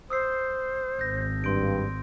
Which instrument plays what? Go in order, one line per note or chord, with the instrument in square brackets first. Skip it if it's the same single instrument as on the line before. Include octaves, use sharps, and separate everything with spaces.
[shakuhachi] C5 [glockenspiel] D#6 E6 C7
[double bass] G#1 [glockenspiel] G6 A#6
[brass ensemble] G2 [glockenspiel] C6 G6 D7